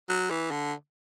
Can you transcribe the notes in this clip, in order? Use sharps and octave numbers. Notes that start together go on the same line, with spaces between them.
F#3
E3
D3